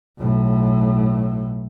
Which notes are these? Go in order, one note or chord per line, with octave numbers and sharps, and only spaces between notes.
B1 A2